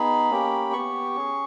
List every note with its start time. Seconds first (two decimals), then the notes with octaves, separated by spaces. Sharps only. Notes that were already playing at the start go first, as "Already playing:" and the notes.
Already playing: B3 D#4 G#4 B5
0.31 A#3 C#4 G4
0.73 B3 G4 C#6
1.16 C#4 G#4